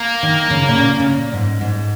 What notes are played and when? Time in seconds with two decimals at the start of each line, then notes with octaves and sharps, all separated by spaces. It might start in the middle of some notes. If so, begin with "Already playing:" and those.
Already playing: A#3
0.23 D#3
0.50 C#3
0.68 A#2
0.78 C#3
1.00 C#3
1.06 A#2
1.34 G#2
1.61 G#2